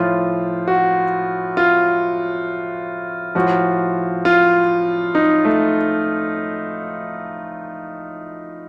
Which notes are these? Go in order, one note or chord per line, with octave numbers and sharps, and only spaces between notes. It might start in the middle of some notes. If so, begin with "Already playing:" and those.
Already playing: A2 F3 F4
F#4
F4
A2 F3 F#4
F4
D#4
A3